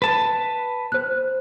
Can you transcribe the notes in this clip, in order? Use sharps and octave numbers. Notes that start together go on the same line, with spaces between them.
B4 A5
C5 F#6